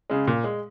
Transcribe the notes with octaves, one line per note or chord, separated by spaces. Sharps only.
C#3 G#3
A#2
G#3